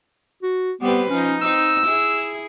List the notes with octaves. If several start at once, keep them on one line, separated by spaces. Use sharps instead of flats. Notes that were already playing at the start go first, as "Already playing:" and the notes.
F#4
G3 B3 C4 B4
F3 C#4 D#4
C4 D#4 E6
E4 G#4